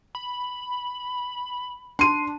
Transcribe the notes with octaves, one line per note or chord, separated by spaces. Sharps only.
B5
D4 C6 D#7